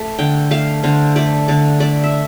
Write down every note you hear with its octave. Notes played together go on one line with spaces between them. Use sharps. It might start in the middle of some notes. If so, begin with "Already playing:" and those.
Already playing: A3
D3 G5
A3 F5
D3 C5
A3 D5
D3 D5
A3 D5
E5